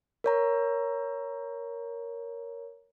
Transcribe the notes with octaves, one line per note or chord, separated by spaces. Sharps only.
A#4 C#5 A#5